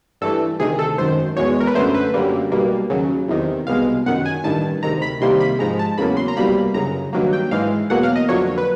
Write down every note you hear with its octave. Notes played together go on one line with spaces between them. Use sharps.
G2 E3 A3 A4
D2 C3 D#3 G#4
A4
G#1 F#2 D#3 C5
E2 B2 G#3 C#5
A#4
B4
F#2 D3 F#3 A3 C5
B4
F#2 D3 G3 A#3
B1 B2 G3 A#3
D#2 C#3 F#3
E2 C3 D#3
C2 B2 G#3 F5
G1 F#2 D#3 F#5
G#5
A1 G2 D#3 A5
D2 C3 D#3 A#5
B5
C2 C3 D#3 G3 A#3 C6
B5
G#2 F3 G#3 A#5
A5
E2 C#3 F#3 A#3 B5
C6
A#5
C2 B2 G3 A#3 B5
G1 F#2 C#3 A#5
G2 D#3 F#3 A#3
G5
G#2 E3 G#3 F5
E2 B2 F#3 A#3 F#5
F5
D#5
F2 D3 F#3 A#3 C#5
B4